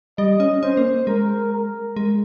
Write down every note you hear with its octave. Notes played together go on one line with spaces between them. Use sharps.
G3 D#5
C#4
C#4 C5
A#3
G#3 A#4
A#4
G#3